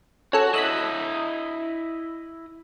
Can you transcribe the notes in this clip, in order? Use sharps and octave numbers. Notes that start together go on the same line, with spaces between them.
C#4 F#4 A4
E4 D#5 E6 F#6 B6